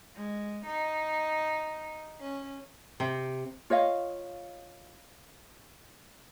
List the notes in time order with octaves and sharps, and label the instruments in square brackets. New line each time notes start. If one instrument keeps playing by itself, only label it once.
[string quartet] G#3
D#4
C#4
[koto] C3
[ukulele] F4 C#5 D#5 F5